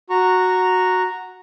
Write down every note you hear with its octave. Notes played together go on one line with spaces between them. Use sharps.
F#4 A#5 C#6